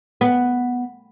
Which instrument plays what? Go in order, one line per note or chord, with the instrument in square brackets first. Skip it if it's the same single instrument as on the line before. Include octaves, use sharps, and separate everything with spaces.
[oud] B3